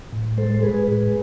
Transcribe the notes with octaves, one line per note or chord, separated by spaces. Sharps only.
A2
G#3 A4 C5
C5
G#3 G#4 B4
A2 G#4 B4